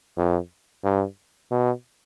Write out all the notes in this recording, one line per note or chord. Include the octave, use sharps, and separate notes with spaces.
F2
G2
B2